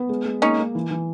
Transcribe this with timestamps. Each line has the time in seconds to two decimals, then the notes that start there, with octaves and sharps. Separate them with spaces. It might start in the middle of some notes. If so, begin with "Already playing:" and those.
Already playing: B3
0.09 G#3
0.25 G#3
0.42 A#3 C#4 D#4
0.59 A#3
0.75 E3
0.91 E3